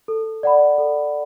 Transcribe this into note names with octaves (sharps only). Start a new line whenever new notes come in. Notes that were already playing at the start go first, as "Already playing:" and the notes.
A4
D5 F#5 B5
A4